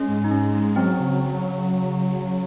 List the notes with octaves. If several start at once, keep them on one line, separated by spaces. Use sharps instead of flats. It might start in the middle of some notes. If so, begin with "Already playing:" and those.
Already playing: G#3 C#4
G#2
D#4
G#2 C#4
G#3
F#3 C4
C#3